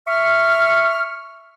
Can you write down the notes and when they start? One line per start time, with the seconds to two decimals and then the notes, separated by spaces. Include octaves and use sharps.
0.08 E5 C#6 F6